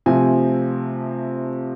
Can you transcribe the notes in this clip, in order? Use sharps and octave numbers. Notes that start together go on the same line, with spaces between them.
C3 F3 A3 C4 G#5